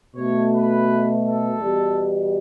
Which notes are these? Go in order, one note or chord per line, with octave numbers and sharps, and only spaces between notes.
B2 A3 C#5
B4
A4
E2 B2 G3